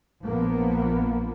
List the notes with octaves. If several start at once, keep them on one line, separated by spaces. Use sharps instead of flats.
A#1 F3 A#3 B3